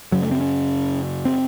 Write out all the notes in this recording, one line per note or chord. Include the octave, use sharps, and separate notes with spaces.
F#2 C#3 F#3
A3
C4
C#4
C4